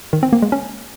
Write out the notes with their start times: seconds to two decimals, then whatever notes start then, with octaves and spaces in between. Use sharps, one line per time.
0.13 D#3
0.23 C4
0.33 A#3
0.42 G#3
0.52 C#4